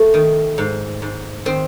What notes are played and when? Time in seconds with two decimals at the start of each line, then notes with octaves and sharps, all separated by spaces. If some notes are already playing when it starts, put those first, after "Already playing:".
Already playing: A3
0.14 D#3
0.58 G#2
1.02 G#2
1.46 D#3 C4